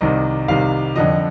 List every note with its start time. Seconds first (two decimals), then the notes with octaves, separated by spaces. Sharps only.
0.01 C2 C3 D#3 D#5
0.48 C2 C3 D#3 F5
0.96 F2 D3 F3 D#5